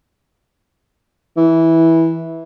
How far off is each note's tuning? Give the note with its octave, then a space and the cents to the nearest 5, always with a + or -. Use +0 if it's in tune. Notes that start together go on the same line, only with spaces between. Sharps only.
E3 -10